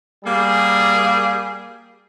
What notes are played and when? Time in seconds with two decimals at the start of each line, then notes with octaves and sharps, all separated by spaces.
0.25 G3 A#3 G#4